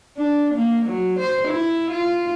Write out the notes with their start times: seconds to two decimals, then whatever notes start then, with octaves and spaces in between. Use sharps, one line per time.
0.17 D4
0.55 A#3
0.86 F#3
1.19 C5
1.48 E4
1.91 F4